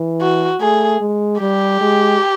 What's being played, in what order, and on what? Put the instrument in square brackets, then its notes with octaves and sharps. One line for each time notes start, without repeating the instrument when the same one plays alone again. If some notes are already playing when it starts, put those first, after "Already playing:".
Already playing: [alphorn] E3
[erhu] F#4
[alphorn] A3 [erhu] G#4
[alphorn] G#3
[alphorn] G3 [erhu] G4
[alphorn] G#3